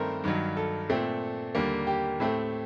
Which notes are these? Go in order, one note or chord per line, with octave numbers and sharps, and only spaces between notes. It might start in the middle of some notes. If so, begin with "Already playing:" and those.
Already playing: G2 D#3 A3 C4 A#4 C5
G2 D#3 F#3
A4
A#2 A3 C4
D#2 D3 G3 A#3
G4
A2 A3 C4